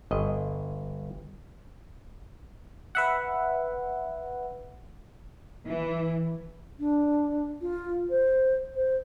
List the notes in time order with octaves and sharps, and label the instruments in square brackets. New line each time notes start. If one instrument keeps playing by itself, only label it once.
[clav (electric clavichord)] G1 D#5
[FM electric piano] B4 E5 F#5
[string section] E3
[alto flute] D4
F4
C5
C5